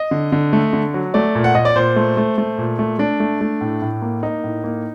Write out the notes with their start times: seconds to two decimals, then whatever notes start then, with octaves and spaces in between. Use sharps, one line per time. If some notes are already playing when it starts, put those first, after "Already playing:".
Already playing: D#5
0.11 D3
0.32 D3
0.53 A3
0.73 D3
0.94 F#3
1.14 A3 D5
1.35 A#2
1.44 F#5
1.55 A#2 D#5
1.65 D5
1.75 A#2 C5
1.96 A3
2.17 A3
2.38 A3
2.58 A#2
2.79 A3
2.99 A3 D4
3.20 A3
3.41 A3
3.61 A2
3.82 A2
4.02 A#3
4.23 A#3 D#4
4.44 A2
4.64 A#3